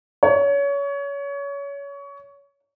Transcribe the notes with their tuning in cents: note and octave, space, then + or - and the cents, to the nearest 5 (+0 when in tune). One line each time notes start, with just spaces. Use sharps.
C#5 +25